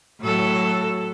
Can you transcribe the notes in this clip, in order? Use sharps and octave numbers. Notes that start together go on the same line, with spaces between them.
A2 F#3 A4